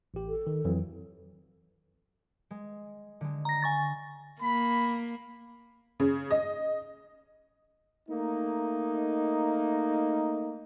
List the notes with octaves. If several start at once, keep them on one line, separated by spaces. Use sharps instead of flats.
A1 G4
A4
D#3
F2 E3 F#3
G#3
D3 G#3
A#5 A#6
G#5 C#6 A6
A#3 B5
C#3
D#5
A3 A#3 D#4